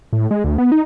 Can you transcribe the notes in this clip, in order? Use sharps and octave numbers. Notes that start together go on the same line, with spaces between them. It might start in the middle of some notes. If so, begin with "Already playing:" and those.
A2
G#3
D2
B3
D#4